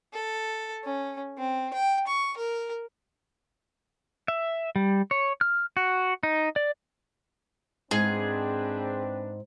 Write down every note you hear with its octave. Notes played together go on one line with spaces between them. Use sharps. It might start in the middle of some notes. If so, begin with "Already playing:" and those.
A4
C#4
C4
G5
C#6
A#4
E5
G3
C#5
F6
F#4
D#4
D5
G#2 C4 D4 G#4 B4